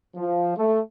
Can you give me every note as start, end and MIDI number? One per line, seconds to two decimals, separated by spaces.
0.16 0.54 53
0.57 0.80 57